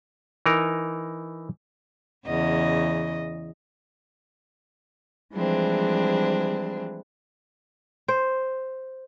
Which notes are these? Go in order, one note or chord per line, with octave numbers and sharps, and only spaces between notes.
E3 D#4 A#4
E2 C#3 D#5
E3 F3 G3 G#3 C4 D4
C5